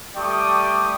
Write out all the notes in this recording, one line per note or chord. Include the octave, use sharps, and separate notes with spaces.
G3 A3 D5 G5 C#6 D#6